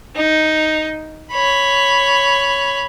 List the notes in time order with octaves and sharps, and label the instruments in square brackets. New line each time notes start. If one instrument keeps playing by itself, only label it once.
[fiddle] D#4
C#5 B5